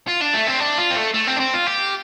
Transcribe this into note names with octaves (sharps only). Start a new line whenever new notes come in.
F4
D4
A3
C4
D4
F4
C4
A3
A3
C4
D4
C4
F4
G4